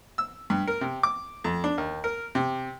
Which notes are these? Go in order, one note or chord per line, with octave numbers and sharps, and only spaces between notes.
E6
G2
A#4
C3
D6
F2
D4
D#2
A#4
C3